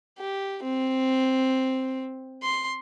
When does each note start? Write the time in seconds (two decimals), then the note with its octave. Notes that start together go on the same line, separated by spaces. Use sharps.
0.19 G4
0.63 C4
2.43 C6